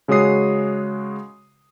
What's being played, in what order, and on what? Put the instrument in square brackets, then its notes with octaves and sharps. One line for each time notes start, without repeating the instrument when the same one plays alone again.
[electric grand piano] C#3 G#3 F#4 C#5 D#6 C7